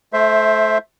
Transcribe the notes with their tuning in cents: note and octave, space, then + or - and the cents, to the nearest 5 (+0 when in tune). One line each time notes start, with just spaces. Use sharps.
A3 -25 C5 +0 E5 +0